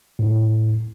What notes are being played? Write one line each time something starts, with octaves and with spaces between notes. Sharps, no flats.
A2